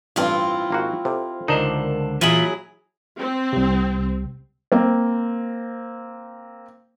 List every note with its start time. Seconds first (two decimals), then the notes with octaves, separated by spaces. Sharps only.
0.16 A1 G2 C4 E4 F4
0.70 G#1 A#3 F#4
1.05 C3 A4 C5
1.48 C#2 D3 D#4 A#4 C5 D5 A5
2.21 A#2 E3 F#3 E4 F4 G#4 E5 B5
3.20 C4
3.53 C2 C3
4.72 A#3 C4